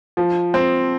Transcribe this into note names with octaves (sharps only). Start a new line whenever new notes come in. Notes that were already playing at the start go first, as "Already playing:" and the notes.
F3
C4